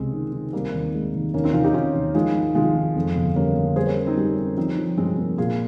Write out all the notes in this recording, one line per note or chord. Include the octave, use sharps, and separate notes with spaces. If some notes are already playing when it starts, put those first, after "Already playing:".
Already playing: C#2 C3 G#3 C4
D#3
D#3
G3 A#3 C4
D#2
G#3
D#2
D#2 A#3 C#4
C4 D#4
D#2 C#4 F4
D#4 G4
D#2 C#4 F4
D#2
D#3 F3 G#3
G#2
G#1 F3 G#3
D#3
F2
G1
G3 A#3 C#4
G3
G3 G#4 C5
A#4 C#5
C#4
C4 D#4
G3
C#4
F3 C4 D#4
F3
G2 G#3 C4
A#3
A#2 F4 G#4